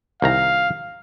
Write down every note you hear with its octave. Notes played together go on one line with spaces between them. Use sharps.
C2 D#3 F5 A#5